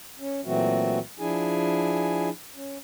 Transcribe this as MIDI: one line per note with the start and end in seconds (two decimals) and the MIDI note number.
0.19 0.41 61
0.45 0.99 46
0.45 0.99 52
0.45 0.99 54
0.45 0.99 57
0.45 0.99 60
0.45 0.99 66
1.19 2.29 53
1.19 2.29 62
1.19 2.29 64
1.19 2.29 68
1.19 2.29 80
2.56 2.78 61